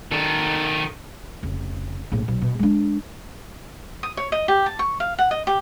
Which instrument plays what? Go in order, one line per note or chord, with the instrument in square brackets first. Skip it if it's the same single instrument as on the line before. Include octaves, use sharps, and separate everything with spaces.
[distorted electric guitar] D#3 A4
[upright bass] F1 C#3
A#1 A2
B1
B2
G#3 D4
[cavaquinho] D#6
C#5
D#5
G4
A5
C#6
F5
F#5
D#5
G4